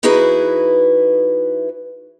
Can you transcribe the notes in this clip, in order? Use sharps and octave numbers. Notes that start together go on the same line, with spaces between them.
E3 D#4 E4 F#4 G#4 B4